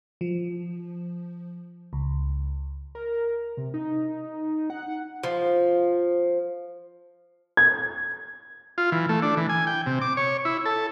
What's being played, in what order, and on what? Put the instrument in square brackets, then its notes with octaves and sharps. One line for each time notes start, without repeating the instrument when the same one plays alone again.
[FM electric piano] F3
C#2
[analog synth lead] A#4
C3
D#4
F#5
[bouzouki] F3
[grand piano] G#6
[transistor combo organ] F4
E3
A3
D4
E3
G#5
G5
C3
D6
C#5
E4
A4